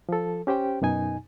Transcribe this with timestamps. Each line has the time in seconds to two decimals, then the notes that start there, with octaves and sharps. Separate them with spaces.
0.09 F3 A4
0.47 C#4 G4 C5 G5
0.82 F#2 B2 D#4 G#5